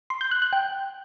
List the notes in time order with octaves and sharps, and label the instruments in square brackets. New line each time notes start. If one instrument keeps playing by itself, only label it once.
[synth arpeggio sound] C6
G6
F#6
F#6
G5